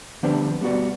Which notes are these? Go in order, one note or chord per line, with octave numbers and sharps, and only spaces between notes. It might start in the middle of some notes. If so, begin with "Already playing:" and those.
D3 F3 G3 B3 C4 D4
G3 B3 F#4 D5